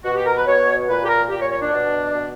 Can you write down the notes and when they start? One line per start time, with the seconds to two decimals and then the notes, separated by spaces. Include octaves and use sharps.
0.04 B2 F#4
0.15 G4
0.26 A#4
0.36 B4
0.47 B2 C#5
0.88 A#2 B4
1.04 G4
1.09 A#4
1.30 A#2 G4
1.40 C#5
1.51 C#5
1.61 D4
1.72 B2
2.14 B2